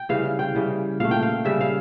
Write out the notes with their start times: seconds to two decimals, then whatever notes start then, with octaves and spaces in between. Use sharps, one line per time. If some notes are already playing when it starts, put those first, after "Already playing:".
Already playing: G5
0.09 C#3 E3 G3 F5
0.25 F5
0.39 G5
0.55 C#3 E3 G3
1.00 A#2 A3 F5
1.11 G5
1.23 F5
1.45 C#3 G3 E5
1.61 F5